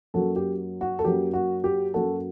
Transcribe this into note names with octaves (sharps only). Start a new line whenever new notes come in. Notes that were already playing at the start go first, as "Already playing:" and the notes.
F#2 F#3 A#3 F#4 A4
G4
F#4
A4
F#2 F#3 A#3 G4
F#4
G4
F#2 F#3 A#3 F#4 A4